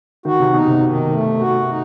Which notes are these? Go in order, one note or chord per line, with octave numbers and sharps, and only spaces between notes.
D#3 F#4
C3
B2 D#4
C3
D#3
A3
F#4
D#4